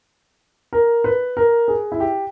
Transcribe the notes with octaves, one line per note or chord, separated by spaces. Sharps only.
A#4
B4
A#4
G#4
E4
G4